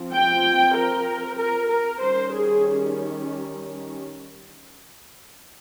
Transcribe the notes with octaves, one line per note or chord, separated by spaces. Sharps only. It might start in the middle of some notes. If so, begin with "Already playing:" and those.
Already playing: F3 C4
G5
A#4
A#4
A#4
D#3 G3 C#4 C5
G#4